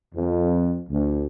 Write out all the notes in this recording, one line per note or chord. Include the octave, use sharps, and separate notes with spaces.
F2
D2